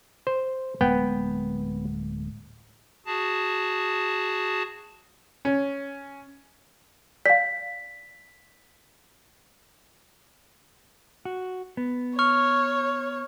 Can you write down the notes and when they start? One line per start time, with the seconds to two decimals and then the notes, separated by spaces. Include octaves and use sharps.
0.27 C5
0.81 D1 G#3 A#3 B3 G5
3.06 F#4 G#4 A5
5.45 C#4
7.26 D5 F5 B6
11.25 F#4
11.77 B3
12.19 C#5 C#6 F6